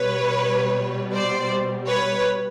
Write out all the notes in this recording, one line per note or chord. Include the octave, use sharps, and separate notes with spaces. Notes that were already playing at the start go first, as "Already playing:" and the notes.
Already playing: B2 G3 B4 C#5
C5 D5
B4 C#5